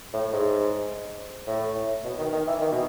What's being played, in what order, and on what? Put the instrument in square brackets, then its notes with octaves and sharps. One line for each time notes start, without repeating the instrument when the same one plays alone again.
[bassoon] A2
G#2
A2
B2
D#3
D#3
E3
D#3
B2